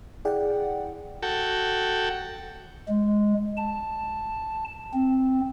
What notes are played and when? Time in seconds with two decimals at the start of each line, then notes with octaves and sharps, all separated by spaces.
0.25 E4 G#4 D5 F#5 G5
1.23 F#4 A4 G5
2.88 G#3
3.57 A5
4.93 C4